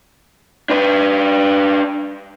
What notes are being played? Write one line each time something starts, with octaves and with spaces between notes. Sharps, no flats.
D4 B4